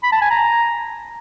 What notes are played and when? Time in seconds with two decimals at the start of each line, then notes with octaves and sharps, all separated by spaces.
0.03 B5
0.12 A5
0.21 G#5
0.30 A#5